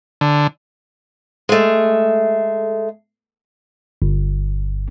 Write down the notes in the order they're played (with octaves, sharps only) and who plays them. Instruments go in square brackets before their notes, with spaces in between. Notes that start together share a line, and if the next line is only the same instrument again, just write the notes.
[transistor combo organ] D3
[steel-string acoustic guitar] G#3 A3
[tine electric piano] G1